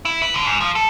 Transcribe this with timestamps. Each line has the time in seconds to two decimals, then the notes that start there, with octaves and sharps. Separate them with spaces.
0.05 E4
0.22 B4
0.34 D3
0.46 G#2
0.61 F3
0.75 A4